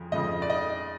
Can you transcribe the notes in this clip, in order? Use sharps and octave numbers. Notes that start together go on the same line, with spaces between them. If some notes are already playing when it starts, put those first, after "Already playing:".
Already playing: F2 C#3 F3
F2 C#3 F3 D#5
D5
D#5